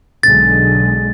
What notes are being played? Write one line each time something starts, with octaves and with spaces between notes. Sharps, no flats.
B1 D3 G#3 A6